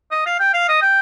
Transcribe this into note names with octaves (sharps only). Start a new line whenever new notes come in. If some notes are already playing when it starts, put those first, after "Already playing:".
D#5
F5
G5
F5
D#5
G5